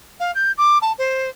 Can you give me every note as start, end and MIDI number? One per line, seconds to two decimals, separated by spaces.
0.20 0.31 77
0.35 0.51 91
0.58 0.78 86
0.82 0.92 81
0.98 1.29 72